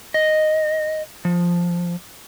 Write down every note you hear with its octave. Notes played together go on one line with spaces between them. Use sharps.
D#5
F3